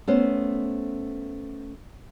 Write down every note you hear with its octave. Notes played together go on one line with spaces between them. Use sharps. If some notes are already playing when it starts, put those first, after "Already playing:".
A3 B3 C#4 C5